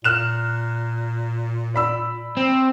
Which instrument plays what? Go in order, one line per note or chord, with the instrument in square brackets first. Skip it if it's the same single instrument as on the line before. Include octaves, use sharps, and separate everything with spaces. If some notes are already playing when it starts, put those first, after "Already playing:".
[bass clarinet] A#2 [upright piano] F6 F#6 E7
[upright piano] D5 B5 E6
[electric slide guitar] C4